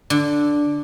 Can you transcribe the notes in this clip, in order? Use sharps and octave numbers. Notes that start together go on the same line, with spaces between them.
D3